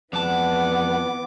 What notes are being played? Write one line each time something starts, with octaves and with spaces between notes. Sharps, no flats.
F2 E3 G#3 B3 D5 F#5 A5 D6